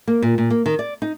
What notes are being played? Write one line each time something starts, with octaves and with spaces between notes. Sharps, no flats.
A#3
A#2
A#2
A#3
D#3
D5
D#4